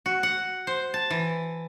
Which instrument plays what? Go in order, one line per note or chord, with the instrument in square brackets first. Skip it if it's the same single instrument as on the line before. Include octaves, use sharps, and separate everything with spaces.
[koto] F#4
F#5
C5
A5
E3